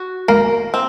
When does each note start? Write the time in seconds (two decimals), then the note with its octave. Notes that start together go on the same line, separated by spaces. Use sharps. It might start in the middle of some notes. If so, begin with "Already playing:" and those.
Already playing: F#4
0.28 A#3 A#4
0.74 C4